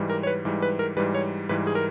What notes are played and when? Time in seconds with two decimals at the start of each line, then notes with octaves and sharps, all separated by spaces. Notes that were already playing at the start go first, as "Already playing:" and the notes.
Already playing: G#2 E3 G3
0.10 A#4
0.23 C#5
0.27 B4
0.45 G#2 E3 G3
0.62 B4
0.79 A#4
0.97 G#2 E3 G3 B4
1.14 C#5
1.49 G#2 E3 G3 B4
1.67 G#4
1.75 A#4